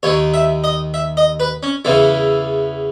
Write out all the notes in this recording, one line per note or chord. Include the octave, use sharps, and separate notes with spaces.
D#2 D#3 C#5
E5
D#5
E5
D#5
B4
C#4
E2 C#3 E3 E4